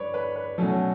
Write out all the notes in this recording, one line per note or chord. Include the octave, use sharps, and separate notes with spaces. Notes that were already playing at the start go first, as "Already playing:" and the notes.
Already playing: G2 B4 C#5 D5
B4
B4
B2 F#3 A3 C#4 A4